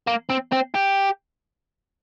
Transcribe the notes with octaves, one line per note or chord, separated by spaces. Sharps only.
A#3
C4
C4
G4